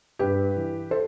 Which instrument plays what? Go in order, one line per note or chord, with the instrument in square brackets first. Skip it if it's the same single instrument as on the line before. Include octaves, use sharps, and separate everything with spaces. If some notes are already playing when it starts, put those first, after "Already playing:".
[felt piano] G2 G4 B4
E3
A4 C5